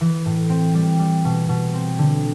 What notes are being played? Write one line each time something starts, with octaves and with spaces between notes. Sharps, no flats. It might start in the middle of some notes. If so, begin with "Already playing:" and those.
E3
A2
C4
G3
G3
B2
B2
C4
D3